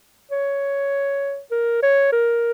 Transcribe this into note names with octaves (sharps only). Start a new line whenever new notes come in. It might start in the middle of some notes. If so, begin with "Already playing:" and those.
C#5
A#4
C#5
A#4